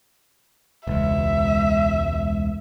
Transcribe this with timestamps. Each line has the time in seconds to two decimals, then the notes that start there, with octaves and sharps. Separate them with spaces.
0.87 E1 C#2 E5